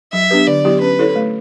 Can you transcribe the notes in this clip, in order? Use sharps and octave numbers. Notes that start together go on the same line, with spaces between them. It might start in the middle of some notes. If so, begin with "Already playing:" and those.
F#3 E5
B3 D4 G4 B4
D3 D5
F#3 B3 E4 G4
C#4 B4
E4 A4 C#5
A3